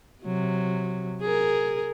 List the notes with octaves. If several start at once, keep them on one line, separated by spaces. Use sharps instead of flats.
C3 F#3
G#4 A#4